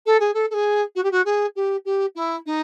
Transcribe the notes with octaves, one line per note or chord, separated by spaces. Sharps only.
A4
G#4
A4
A4
G#4
F#4
G4
F#4
G#4
G4
G4
E4
D#4